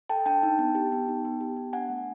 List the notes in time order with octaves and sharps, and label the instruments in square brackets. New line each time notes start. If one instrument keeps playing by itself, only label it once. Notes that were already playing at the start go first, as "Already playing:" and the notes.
[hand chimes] A4 G5 A5
D4 G5 A5
D#4
B3
G4
B3
D#4
B3
G4
B3
D4 F#5 G#5
A3